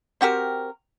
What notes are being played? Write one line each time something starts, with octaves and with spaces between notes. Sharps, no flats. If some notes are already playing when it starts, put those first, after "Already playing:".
C4 F#4 G4 A#4